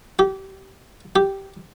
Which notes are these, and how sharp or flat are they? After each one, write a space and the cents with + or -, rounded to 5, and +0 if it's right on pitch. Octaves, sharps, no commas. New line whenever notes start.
G4 -25
G4 -5